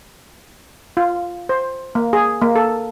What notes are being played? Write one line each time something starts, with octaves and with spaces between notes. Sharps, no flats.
F4
C5
A#3
G#4
A#3
A4